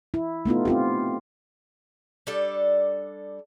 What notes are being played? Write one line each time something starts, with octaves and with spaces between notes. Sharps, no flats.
E4
A3 B3 D#4 F4
C4 F4 G4
G3 D4 A4 D5